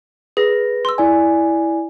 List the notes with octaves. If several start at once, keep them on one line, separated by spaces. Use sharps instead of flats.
G#4 B4 A#6
C6 E6
E4 D5 G#5